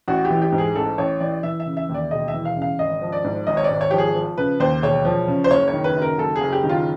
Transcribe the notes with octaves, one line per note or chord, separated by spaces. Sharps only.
A1 F#4
G4
E3
G4
G#2
G#4
A1 A4
A1 C#5
E3 D5
E3 E5
E5
C#3
E5
D#2
D5
E1 D#5
E5
E3
F5
C#3
F5
G#1 D#5
F3
D5
G#2
G#1 D#5
C#5
D5
G#1
C#5
F3 G4
G#4
F3
C#3 B4
D#2 C5
E1 C#5
F3
C#3
C5
F#1 C#5
C#5
D#3
B4
F#2
A#4
F#1 A4
G#4
F#1
G4
D#3
F4